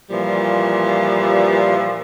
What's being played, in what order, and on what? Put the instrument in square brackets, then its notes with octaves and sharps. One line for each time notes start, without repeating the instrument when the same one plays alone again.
[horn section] A#2 E3 F3 G3